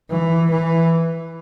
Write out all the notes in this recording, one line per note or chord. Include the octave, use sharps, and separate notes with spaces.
E3
E3